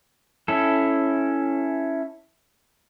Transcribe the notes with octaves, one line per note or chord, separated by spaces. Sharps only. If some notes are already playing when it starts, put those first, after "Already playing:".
C#4 E4 A4